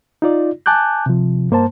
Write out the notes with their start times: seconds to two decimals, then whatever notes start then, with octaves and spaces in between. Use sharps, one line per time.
0.22 D#4 F4 D5
0.66 G#5 A5 D6 F#6 G6
1.06 C3 F3
1.51 G2 A#3 C5 A5